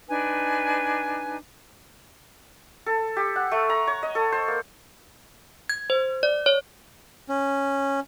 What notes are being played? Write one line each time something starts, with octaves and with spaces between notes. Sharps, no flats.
D4 D#4 B4 G#5
A4
G4
F#5
A3
A#5
C#5
D#5
A4
C5
A#3
G#6
C5
D5
C#5
C#4